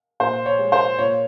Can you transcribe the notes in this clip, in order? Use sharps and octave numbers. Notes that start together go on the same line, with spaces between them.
A#2 C5
C#5
G#3
C5
A#2 C#5